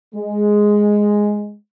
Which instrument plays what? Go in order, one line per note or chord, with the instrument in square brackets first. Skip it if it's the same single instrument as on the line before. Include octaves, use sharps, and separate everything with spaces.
[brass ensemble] G#3